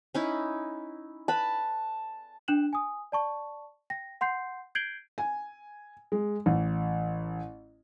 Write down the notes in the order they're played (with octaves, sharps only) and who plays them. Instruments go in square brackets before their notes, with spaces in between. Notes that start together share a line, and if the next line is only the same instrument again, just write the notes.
[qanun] C#4 D#4 E4
[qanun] B4 B5 [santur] A5
[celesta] D4 G5 F#6 E7 F#7
G#5 D#6
D5 A5 C#6
G5 A#6
F#5 C6 G6 C7
G6 G#6 C7 D7 F#7 G7
[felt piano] G#5
G#3
A1